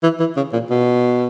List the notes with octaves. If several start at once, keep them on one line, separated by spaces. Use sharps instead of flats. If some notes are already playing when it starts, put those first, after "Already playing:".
E3
E3
C#3
A#2
B2